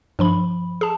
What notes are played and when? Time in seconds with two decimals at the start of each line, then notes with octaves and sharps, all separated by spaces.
0.19 G2 F3 B5
0.81 G#4 A5